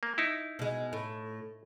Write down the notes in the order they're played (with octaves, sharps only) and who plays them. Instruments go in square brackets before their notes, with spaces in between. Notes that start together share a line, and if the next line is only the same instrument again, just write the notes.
[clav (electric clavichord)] A#3
D#4 E4
[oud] B2 G#3
A2